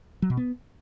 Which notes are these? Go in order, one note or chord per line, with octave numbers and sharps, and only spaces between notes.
F#3
B2
B3